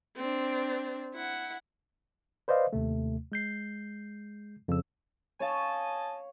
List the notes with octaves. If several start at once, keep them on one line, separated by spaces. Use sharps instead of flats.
C4 D4
E4 F#5
B4 C5 D5 D#5 F5
D#2 C3 A3
G#3 G6 C7
F2 C#3 E6
C#5 D#5 F5 G#5 A5